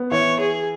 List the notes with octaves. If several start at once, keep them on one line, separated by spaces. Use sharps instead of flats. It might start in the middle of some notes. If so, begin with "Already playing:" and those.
Already playing: B3
E3 C#5
G#4